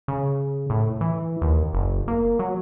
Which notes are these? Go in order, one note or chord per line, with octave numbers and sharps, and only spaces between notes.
C#3
A2
E3
D#2
F#1
A#3
F#3